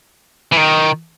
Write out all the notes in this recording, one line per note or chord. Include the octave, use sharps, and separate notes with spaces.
E3
D#3